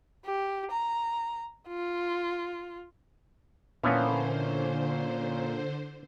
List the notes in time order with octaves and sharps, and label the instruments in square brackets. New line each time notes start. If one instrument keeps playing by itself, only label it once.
[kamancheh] G4
A#5
F4
[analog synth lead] A#2 [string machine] D3 C5 [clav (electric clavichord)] E3 F3 B3 [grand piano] A#3 C#4